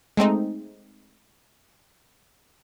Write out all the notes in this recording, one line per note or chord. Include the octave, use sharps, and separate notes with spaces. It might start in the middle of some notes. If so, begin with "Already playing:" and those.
G#3 A3 C4 D#4